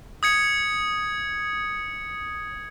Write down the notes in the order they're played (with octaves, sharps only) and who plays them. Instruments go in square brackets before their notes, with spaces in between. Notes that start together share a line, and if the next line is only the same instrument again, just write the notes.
[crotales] D#6 G#6 C#7